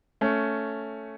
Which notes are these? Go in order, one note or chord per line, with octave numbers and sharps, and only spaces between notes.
A3 C#4